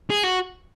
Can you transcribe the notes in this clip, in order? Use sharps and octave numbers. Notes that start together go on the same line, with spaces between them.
G#4
F#4